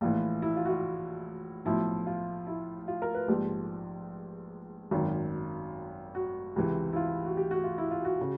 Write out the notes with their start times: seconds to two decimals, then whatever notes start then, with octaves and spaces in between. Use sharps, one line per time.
0.01 A#1 A2 E3 F4
0.42 E4
0.57 F4
0.65 F#4
0.69 F4
1.65 B1 A2 F3 E4
2.07 F4
2.47 E4
2.88 F4
3.02 A#4
3.15 B4
3.28 A#1 G#2 F3 G4
4.91 G#1 F#2 D#3 F#3
6.15 F#4
6.56 C#2 C3 E3
6.93 E4
6.96 F4
7.26 F#4
7.37 G4
7.51 F#4
7.64 F4
7.78 E4
7.91 F4
8.05 F#4
8.21 C#3